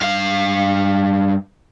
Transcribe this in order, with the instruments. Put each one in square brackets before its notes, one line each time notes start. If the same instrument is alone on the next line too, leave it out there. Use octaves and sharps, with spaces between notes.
[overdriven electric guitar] G2 F5